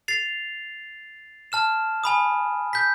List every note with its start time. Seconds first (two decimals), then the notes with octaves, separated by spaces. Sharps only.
0.08 A6 C7 F7
1.52 A5 F6 E7
2.04 G#5 B5 D#6
2.73 G6 B6